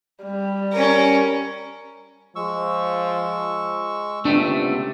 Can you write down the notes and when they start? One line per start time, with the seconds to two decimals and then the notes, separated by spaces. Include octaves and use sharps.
0.24 G3
0.72 C#4 A#4
2.36 F3 G#3 C#6 E6
4.25 C#2 C3 A3 B3 D4